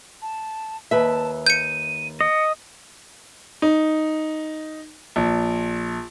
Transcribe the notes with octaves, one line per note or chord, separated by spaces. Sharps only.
A5
D#2 B4 E5 A5
G6 C#7 D#7
D#5 C#7
D#4
A#1